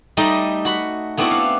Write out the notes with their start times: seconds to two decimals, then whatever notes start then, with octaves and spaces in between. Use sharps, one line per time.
0.17 G3 A3 D#4 D#5 A#5 B5
0.65 F#4 B5
1.17 A3 B3 C4 D4 E4 F#4
1.31 F5